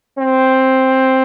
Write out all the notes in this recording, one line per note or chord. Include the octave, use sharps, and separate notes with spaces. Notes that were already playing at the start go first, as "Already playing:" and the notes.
C4